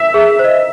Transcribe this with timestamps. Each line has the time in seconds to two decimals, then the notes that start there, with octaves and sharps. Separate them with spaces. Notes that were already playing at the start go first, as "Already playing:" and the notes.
Already playing: E5
0.14 G#4
0.39 C5
0.44 D#5